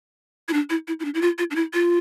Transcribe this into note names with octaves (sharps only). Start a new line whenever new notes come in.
E4
D4
E4
E4
E4
D4
E4
F4
F4
D4
E4
F4